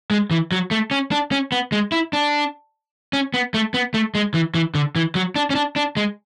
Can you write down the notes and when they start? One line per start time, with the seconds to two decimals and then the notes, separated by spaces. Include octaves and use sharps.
0.11 G#3
0.31 E3
0.52 F#3
0.71 A3
0.91 C#4
1.11 D4
1.31 C#4
1.52 B3
1.72 G#3
1.92 E4
2.13 D4
3.13 C#4
3.34 B3
3.54 A3
3.74 B3
3.94 A3
4.15 G#3
4.34 E3
4.55 E3
4.75 D3
4.96 E3
5.15 F#3
5.36 D4
5.50 C#4
5.55 D4
5.76 D4
5.97 G#3